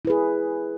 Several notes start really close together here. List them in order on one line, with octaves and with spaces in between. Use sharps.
E4 B4 G#4